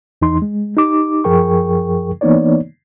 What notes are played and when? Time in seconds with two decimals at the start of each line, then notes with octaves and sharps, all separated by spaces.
0.22 E2 E3 D#4 C6
0.42 G#3
0.77 D#4 G4 D6
1.24 F#2 F3 G#4 A#4 G5 C#6
2.21 E3 A#3 B3 D#4 C#5 D5